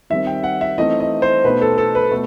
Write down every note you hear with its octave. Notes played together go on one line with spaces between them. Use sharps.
D#3 G3 C4 E5
G5
F#5
E5
E3 A3 C4 D#4 D#5
D#5
C5
B2 A3 D#4 B4
A4
A4
B4
B2 A3